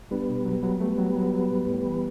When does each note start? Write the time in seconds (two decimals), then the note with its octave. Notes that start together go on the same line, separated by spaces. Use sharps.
0.11 G3 B3 D4
0.29 B2
0.46 F#3
0.63 F#3
0.80 G3 A3 B3
0.98 F#3
1.15 F#3
1.34 F#3
1.50 A2
1.68 A2
1.86 E3